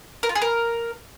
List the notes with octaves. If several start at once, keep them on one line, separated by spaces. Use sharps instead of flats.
A#4
F4
G#4
A#4